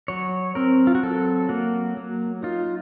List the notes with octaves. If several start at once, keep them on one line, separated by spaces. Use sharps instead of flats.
F#3 C#5
C4 A#4
F4
F#4
F#3 A4
A#3 F#4
F#3
D#4 F4